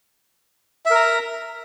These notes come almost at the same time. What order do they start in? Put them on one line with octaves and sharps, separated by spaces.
E5 A#4 A#5